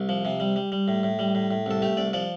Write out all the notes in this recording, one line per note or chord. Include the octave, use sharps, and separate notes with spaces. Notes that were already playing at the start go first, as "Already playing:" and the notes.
Already playing: C2
F3
C3
G3
G3
G3
A2
A2
G3
A2
A2
C2 A4
A3 G4
C2 D5
F3 D5